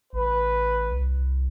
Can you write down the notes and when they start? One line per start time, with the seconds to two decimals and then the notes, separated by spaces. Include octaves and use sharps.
0.13 A1 B4
0.91 C2